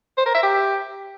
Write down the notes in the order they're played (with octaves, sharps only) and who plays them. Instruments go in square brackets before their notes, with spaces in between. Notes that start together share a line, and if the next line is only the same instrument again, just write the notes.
[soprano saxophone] C5
A#4
E5
G4